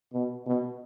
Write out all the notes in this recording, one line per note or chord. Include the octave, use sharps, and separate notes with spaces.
B2
B2